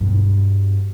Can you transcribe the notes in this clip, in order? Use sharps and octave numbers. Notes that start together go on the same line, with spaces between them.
G2 B2